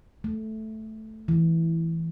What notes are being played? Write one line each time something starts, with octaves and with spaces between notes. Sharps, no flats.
A3
E3